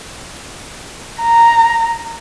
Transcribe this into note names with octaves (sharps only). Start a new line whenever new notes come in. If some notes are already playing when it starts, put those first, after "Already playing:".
A#5